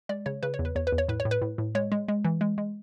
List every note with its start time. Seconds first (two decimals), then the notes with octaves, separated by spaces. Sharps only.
0.09 G#3 D5
0.26 C#3 C#5
0.43 C#3 B4
0.54 C#5
0.59 E2
0.65 B4
0.75 E2 C#5
0.87 B4
0.92 E2
0.98 C#5
1.08 A2 B4
1.20 C#5
1.25 A2
1.31 B4
1.42 A2
1.58 A2
1.75 G#3 C#5
1.92 G#3
2.08 G#3
2.25 E3
2.41 G#3
2.58 G#3